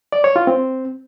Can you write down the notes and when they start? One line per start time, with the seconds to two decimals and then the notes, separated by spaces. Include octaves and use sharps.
0.12 D5
0.24 C#5
0.36 F4
0.47 C4